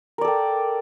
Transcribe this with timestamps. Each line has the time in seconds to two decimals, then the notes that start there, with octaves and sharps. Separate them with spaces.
0.18 A#4
0.21 D5
0.24 A4
0.28 G5